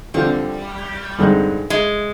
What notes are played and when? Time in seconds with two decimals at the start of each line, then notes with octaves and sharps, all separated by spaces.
0.14 D3 F3 G3 C4
1.18 G2 D3 G#3 C4 D#4
1.70 G#3